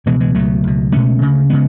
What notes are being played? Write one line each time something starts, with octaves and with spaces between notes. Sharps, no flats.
C#2 B2 E3 G#3
E3 G#3
C#2 B2 F#3 A3
C#2 B2
C#2 B2 A3 C#4
D2 C#3
C#3 G#3 B3